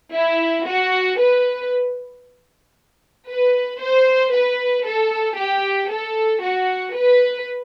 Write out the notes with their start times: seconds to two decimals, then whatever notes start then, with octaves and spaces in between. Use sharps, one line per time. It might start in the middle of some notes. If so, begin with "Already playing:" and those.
0.13 E4
0.66 F#4
1.18 B4
3.29 B4
3.81 C5
4.33 B4
4.86 A4
5.38 G4
5.91 A4
6.44 F#4
6.96 B4